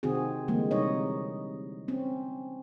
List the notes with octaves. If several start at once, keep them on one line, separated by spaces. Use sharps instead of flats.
C3 D#3 C4 F#4 G#4
D3 E3 G3 G#3 A#3
C3 G3 D#4 C#5 D#5
C4 C#4